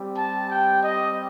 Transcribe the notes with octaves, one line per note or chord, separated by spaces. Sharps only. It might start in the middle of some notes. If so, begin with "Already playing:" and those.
Already playing: G3 C4 G4
A5
G5
D#5